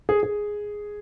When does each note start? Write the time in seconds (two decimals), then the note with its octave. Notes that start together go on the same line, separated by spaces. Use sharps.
0.09 G#4
0.23 G#4